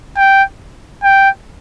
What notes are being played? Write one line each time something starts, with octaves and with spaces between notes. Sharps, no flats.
G5
G5